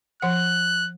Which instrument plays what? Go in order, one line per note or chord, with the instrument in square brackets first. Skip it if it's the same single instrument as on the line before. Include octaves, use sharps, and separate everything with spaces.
[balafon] F3 F#5 [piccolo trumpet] F#6